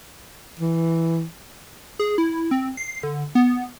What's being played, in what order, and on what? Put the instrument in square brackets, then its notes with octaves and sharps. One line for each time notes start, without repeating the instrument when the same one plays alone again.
[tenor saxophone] E3
[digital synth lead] G#4
E4
C4
C7
D3
B3